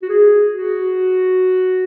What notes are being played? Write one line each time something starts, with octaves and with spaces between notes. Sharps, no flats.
F#4
G#4
F#4